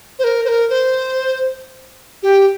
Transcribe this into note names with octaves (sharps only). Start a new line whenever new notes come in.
C5
A#4
C5
A#4
C5
G4